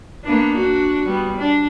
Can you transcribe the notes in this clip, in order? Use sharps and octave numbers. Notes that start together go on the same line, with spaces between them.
A#3 B3 D4
D4 F#4
G3 B3
D4